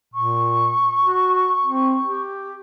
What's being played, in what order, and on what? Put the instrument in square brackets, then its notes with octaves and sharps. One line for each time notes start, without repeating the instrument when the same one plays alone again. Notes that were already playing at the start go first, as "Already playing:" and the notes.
[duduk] A#2 [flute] C#6
[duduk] F#4
C4
G4